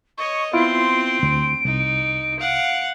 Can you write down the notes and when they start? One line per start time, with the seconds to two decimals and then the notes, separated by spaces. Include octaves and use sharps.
0.17 C#5 D#5 C#6
0.53 B3 C4 E4 F4 C6 D7
1.23 D2
1.65 C2 D#4
2.39 F5 F#5